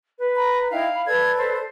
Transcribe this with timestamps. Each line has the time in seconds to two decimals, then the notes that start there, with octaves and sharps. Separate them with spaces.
0.19 B4
0.35 A#5 B5
0.71 D#4 E4 F5 G5
0.93 B5
1.06 A4 B4 D5 G#6
1.38 C5